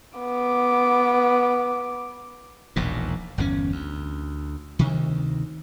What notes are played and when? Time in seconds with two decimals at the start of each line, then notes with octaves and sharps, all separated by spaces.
0.18 B3 D6
2.76 E1 A#1 D#2 A#2
3.38 G1 E2 D3 C#4
3.72 D2
4.79 D2 C3 D#3